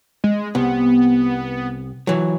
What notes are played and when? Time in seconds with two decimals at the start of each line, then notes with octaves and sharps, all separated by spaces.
0.24 G#3
0.55 C2 B3
2.07 E3 F#3